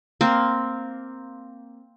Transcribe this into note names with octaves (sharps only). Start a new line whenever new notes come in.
A#3 C4